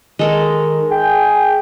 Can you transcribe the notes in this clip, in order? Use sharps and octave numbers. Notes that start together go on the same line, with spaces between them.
D#3 G#3 A4 A#4
G#4 G5